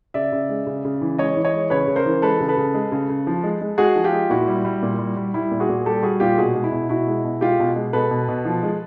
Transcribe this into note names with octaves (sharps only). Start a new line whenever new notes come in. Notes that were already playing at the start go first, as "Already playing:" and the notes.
C#3 D5 E5
C#3
G#3
C#3
C#3
E3
G#3 C#5 D#5
E3
C#5 D#5
G#3
C#3 B4 C#5
C#3
A#4 C5
E3
G#3 A4 B4
C#3
A4 B4
C#3
G#3
C#3
C#3
F3
G#3
G#3
G#3 F#4 G#4
F3
F4 G4
G#3
A#2 E4 F#4
G3
G3
A#2
G3
G3
G3 E4
A#2
F#4 G#4
A#2
G3 G4 A4
G3 F#4 G#4
A#2 F4 G4
B2 F#4 G#4
G#3
E4
B2
B2 E4 F#4
G#3
B2
G#3 F4 G4
B2
G#3
B2 A4 B4
B2
B2
F3
G#3